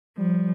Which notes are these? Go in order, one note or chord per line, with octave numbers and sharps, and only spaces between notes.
F3 G3